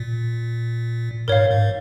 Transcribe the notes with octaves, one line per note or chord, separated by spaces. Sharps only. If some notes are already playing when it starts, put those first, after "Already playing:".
Already playing: A#2
G#2 A#4 C#5 F5
G#2